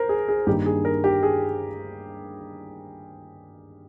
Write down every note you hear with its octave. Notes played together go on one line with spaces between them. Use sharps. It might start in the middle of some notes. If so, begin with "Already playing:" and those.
Already playing: A#4 C5
G#4
G#4
G2 D#3 A#3 D#4 G4
G#4
A#4
G4
G#4